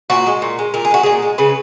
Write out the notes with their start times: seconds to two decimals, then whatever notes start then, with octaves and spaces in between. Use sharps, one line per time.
0.10 A#2 F#4
0.26 G#3
0.42 A#2
0.59 G#3
0.74 A#2 A#4
0.85 G#4
0.91 G#3 F#4
1.03 A#2 G#4
1.22 G#3
1.38 C#3 B4